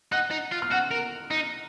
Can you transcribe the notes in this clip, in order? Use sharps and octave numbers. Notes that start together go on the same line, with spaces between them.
D#4 F#5 F#6
D#4
F4
F6
F#4 F#5 F#6
A#4
D#4